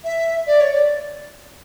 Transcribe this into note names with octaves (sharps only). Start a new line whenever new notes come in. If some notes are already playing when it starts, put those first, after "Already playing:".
E5
D5
C#5
D5